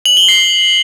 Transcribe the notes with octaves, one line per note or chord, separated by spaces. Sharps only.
F#7
G7
C7